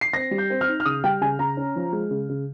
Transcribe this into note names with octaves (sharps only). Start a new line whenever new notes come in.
C7
C4 A#6
G3
G6
C4
F6
D#4
F6
C#3 D#6
G3 G5
C#3 G#5
C#3 A#5
C#4
F3
G#3
C#3
C#3